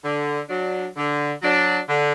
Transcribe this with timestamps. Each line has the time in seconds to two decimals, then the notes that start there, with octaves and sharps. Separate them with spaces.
0.04 D3
0.49 F#3 D4
0.96 D3
1.42 F#3 D4
1.89 D3